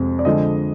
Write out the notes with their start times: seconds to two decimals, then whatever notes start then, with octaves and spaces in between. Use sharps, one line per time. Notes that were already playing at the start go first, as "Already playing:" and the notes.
Already playing: F2 C3 G#3
0.19 D5
0.25 D3 F3 G#3 D#5